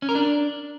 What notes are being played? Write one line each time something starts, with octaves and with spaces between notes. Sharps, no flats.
C#4
A#4
D4